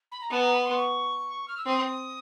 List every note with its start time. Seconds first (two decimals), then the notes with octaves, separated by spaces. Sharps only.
0.11 B5
0.21 A#5
0.31 B3 A5
0.42 A#5
0.54 B5
0.65 C6
0.76 C#6
1.48 F6
1.57 E6
1.66 C4 D#6